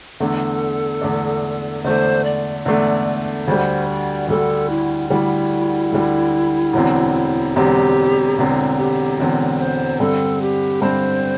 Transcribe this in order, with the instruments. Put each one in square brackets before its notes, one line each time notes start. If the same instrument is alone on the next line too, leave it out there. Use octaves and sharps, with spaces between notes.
[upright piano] E2 D3 A3 D4 [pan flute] A4
[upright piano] E2 D3 A3 D4
[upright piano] E2 D3 A3 D4 [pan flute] C5
[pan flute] D5
[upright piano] E2 D3 A3 D4 [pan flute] D5
[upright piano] D2 D3 G3 [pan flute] C5
[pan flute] D5
[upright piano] D2 D3 G3 [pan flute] A4
[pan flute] E4
[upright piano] D2 D3 G3 [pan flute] E4
[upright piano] D2 D3 G3
E1 E2 D3 C4
[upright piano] E1 E2 D3 C4 [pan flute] G4
[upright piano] E1 E2 D3 C4
[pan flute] G4
[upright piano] E1 E2 D3 C4
[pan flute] C5
[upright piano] G2 D3 C4 [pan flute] A4
[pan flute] G4
[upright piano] G2 D3 C4 [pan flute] C5